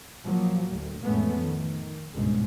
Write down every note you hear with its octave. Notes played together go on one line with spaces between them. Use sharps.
A#1 F3 F#3 A#3
D2 A2
A1 F2 G#3 A3 B3 C#4
D#3
D#3
G1 C#2 G#2 B2 G#3